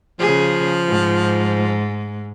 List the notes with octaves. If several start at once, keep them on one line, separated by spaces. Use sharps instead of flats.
C#3 F3 G#4
G#2